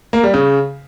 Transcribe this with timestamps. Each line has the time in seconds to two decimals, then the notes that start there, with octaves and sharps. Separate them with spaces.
0.13 A#3
0.23 G3
0.34 C#3